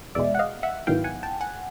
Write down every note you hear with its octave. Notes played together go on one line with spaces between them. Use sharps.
E2 B2 G#3 D5 E5
F#5
D#5 F5
E5 F#5
G#2 D#3 F#3 B3 E4 F5 G5
F#5 G#5
G5 A5
F#5 G#5